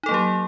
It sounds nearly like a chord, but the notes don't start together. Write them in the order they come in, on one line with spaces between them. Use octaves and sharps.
D#4 A4 A#3 F#3 G4